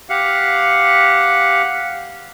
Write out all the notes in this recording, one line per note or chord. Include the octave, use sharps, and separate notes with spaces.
G4 F5 F#5